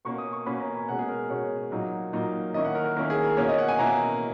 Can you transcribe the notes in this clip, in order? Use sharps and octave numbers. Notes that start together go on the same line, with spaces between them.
B2 A#3 C#4 C#6
D#6
C#6
B2 A#3 C#4 B5
A#5
G#5
B2 G#3 C#4 F#5
G#4
A#4
B2 G#3 C#4 C#5
A#2 F#3 A#3 D#4
A#2 F#3 A#3 D#4
D#3 A#3 C#4 E4 D#5
F#5
A#4
A#4
D#3 A#3 C#4 E4 A#4
G#4
A#4
B2 A#3 C#4 E4 C#5
D#5
F#5
G#5
B2 A#3 C#4 E4 A#5